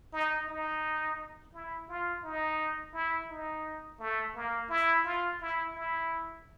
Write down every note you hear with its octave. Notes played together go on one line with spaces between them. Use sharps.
D#4
D#4
E4
F4
D#4
E4
D#4
A3
A#3
E4
F4
E4
E4